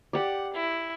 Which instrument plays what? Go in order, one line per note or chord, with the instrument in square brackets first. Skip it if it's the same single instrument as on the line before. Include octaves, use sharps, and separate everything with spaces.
[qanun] G4 D5 [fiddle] F#5
[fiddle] E4